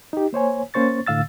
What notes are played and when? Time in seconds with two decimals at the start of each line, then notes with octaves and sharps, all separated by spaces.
0.13 D#4 G4
0.33 A#3 C5 C#5 G#5
0.74 A#3 C#4 C5 C#6 A6
1.07 A2 D3 F5 E6 A6